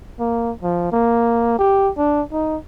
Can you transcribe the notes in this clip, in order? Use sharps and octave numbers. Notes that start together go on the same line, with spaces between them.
A#3
F3
A#3
G4
D4
D#4